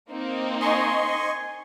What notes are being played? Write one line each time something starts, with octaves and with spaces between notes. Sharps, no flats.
A#3 C4 D#4
D#5 G#5 C6 C#6